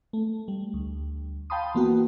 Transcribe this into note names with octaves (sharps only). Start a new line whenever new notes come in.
A3
G3
D2
F5 G5 A5 B5 C6 D#6
E3 A#3 B3 F#4